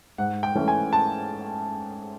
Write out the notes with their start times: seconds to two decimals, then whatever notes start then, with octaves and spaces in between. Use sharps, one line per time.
0.18 G#2 F#5
0.43 G5
0.55 E3 A3 C#4
0.68 G#5
0.93 A5